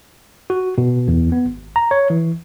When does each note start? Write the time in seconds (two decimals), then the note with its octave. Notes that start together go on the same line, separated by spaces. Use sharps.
0.50 F#4
0.78 B2
1.08 E2
1.32 B3
1.46 G#1
1.76 A#5
1.91 C#5
2.10 E3